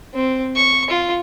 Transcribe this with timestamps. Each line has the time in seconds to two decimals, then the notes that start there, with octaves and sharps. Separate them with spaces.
0.14 C4
0.56 C#6
0.90 F4